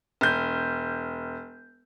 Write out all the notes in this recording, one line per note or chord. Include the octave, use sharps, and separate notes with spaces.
E1 G6